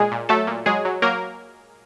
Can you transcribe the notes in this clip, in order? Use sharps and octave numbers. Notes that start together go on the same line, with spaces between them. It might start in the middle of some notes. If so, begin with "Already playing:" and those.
Already playing: A#2 G#3 G#4
A#2
F#3 A3 A4
A#2
F#3 G#3 G#4
F#3
F#3 A#3 A#4